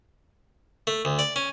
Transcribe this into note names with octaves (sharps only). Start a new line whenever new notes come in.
A3
D2
D5
C#4